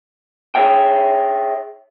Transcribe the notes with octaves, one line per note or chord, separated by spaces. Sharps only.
G#4 A4 C#5 E5 G5